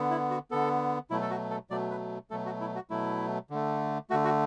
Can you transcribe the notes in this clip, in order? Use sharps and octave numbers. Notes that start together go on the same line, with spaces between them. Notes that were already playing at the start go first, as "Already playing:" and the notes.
Already playing: D3 B3
E4
F#4
D3 B3 A4
B2 F#3 A3 E4
A4
F#4
A4
B2 F#3 A3 D5
B4
B2 F#3 A3 A4
F#4
E4
F#4
B2 F#3 A3 E4
D3 A3
D3 A3 F#4
F#4